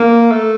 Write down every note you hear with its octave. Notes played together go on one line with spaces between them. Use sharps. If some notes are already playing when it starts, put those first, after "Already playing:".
Already playing: A#3
A3